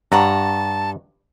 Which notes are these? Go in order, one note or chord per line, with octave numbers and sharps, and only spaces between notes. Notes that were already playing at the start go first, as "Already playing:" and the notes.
G2 C#5 F#5 A5 A#5